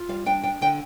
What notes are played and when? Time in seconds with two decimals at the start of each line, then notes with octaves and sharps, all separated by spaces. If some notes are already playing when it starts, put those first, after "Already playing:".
Already playing: F4
0.09 G3 F5
0.26 D4 G5
0.43 D4 G5
0.61 D3 G5